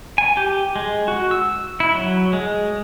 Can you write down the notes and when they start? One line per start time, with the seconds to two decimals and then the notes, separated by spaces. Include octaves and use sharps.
0.18 G#5
0.37 G4
0.76 G#3
1.08 F#4
1.31 E6
1.80 E4
1.94 F#3
2.33 G#3